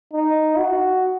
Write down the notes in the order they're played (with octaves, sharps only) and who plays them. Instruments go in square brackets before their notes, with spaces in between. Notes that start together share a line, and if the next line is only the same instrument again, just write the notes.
[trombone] D#4
F#4